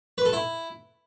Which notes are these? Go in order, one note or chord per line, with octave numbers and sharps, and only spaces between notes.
B4
A4
E4